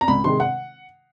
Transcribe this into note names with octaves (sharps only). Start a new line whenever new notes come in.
A#5
C#2 B5
C3 D#3 G#3 C6
F#5